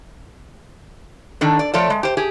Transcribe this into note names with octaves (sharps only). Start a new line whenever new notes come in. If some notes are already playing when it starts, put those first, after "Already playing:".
D#3 D4 A4
D5
F3 A3 A4 C#5 D5
G#3
G4 C5
G4 G#4